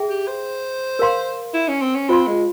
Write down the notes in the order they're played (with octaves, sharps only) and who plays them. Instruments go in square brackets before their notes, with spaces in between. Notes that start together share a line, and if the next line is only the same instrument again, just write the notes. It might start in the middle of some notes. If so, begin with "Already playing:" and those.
Already playing: [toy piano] G#4 E5 G5
[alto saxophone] G4
C5
[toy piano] A#4 F5 C6
[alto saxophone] E4
C#4
C4
C#4
[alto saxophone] C4 [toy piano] F4 C5 F5 C6
[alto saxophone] G#3